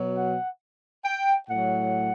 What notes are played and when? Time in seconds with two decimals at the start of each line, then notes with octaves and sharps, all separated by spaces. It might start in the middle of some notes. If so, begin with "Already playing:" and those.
Already playing: B2 F#3
0.17 F#5
1.04 G5
1.49 A2 F#3 F#5